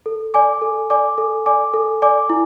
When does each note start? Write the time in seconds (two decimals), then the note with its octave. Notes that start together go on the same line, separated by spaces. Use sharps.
0.06 A4
0.34 D5 G#5 D6
0.61 A4
0.90 D5 G#5 D6
1.18 A4
1.46 D5 G#5 D6
1.74 A4
2.02 D5 G#5 D6
2.30 E4